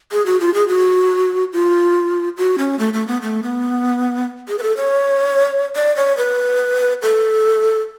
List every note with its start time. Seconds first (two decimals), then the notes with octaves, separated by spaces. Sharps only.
0.12 G#4
0.26 F#4
0.40 F4
0.54 G#4
0.68 F#4
1.53 F4
2.37 F#4
2.58 C#4
2.79 A3
2.94 A3
3.07 B3
3.22 A3
3.43 B3
4.48 G#4
4.58 B4
4.63 A4
4.77 C#5
5.76 D5
5.96 C#5
6.17 B4
7.02 A4